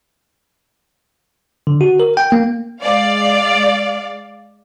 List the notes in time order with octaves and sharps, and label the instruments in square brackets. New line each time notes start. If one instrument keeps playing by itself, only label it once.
[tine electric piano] D3
F#4
A#4
G5
A#3
[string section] G#3 D5 F5